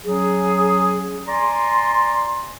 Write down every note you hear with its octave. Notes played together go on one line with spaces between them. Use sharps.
F#3 C#4 G#4
D5 G#5 A#5 C6